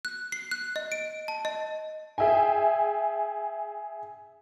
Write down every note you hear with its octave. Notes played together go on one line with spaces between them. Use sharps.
F#6
C7
F#6
D#5
D7
A5
D#5
G#4 E5 G5 G#5